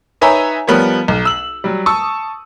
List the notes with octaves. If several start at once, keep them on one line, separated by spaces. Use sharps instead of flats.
D#4 B4 C#5 E5 G#5 A#5
F3 G3 B3 A#4 C#5
B1
E6 F#7
F#3 G3
A5 C#6 D#6 E6